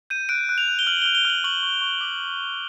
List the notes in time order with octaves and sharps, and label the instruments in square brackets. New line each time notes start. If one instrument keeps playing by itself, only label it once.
[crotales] G6 D#7
F#6 D7
F#6
F7
F#6
G7
F6 F#7
F6 G7
G7
F6 F#7
C#6 F#7
C#6
C#6
D6